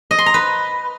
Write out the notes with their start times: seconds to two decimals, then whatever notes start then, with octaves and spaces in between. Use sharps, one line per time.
0.11 D#5
0.18 C6
0.26 A#5
0.34 B4